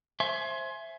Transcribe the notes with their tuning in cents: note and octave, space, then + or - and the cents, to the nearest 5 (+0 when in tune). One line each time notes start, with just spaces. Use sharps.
C5 +20 E5 +10 G#5 +20